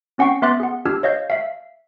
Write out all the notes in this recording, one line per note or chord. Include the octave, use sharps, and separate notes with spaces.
C4 C#4 F#5 G5 C#6 C7
B3 E5 C6 D6 F#6 A6
G#4 F#5
D4 F4 G4 E6 F6
C#5 D#5 F5 G6
E5 F5